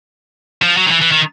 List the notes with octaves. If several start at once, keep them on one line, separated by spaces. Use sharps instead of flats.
F3
F#3
D#3
E3
E3
D#3